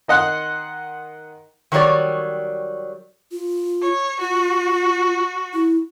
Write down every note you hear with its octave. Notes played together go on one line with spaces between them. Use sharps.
D#3 D#5 F#5 C6 F#6
D#3 F#3 G3 C#5 D5
F4
C#5
F4 F#4
E4